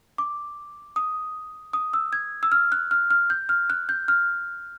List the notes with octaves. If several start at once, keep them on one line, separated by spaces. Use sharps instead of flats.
D6
D#6
D#6
E6
G#6
E6
F6
F#6
F6
F6
G6
F6
F#6
G6
F6